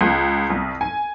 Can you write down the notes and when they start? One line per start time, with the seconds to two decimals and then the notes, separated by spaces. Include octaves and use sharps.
0.01 C#2
0.50 C2
0.81 G#5